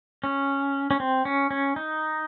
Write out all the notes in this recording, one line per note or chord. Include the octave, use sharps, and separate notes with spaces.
C#4
C#4
C4
C#4
C#4
D#4